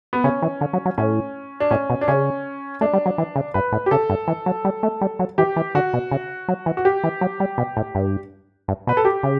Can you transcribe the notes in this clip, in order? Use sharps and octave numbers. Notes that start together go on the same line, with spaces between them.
B3
C#3 C#4
E3
D3
F#3
F#3
A2 C#4
D4
A2 C#4
B2
D4
C#3 C#4
A3 D4
G3
F#3
E3
C#3
G2 B4
A2
G4
C#3 A4
G2
E3
F#3
G3
A3
G3
F#3
E3 G4
E3
D3 F#4
B2
C#3
F#3
E3
F#4
G4
E3
F#3
G3
B2
A2
G2
G2
B2 B4
A4
G4
C#3